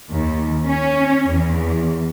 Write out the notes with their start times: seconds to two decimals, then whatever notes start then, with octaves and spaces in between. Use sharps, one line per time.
0.10 D#2
0.66 C#4
1.28 E2